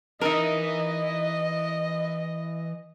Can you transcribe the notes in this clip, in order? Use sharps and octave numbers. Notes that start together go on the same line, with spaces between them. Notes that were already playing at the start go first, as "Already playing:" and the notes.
E3 D#4 A#4 D#5 E5